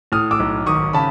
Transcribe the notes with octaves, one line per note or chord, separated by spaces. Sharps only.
A2 D#6 F6
D6 E6
B1
G#1 C#6 D#6
C#3 A5 B5